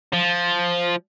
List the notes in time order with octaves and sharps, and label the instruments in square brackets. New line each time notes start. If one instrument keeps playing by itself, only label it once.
[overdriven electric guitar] F3